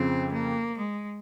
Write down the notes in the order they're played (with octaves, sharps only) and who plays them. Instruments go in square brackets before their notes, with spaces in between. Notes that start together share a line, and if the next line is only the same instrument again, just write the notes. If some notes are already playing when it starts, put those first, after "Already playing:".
Already playing: [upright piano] F2 C#3 F3 [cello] C4
[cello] A#3
G#3